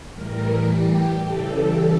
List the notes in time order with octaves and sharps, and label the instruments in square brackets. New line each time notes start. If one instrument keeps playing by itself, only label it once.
[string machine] A2 E3 G3 A#4
G4
C#3 E3 G3 A4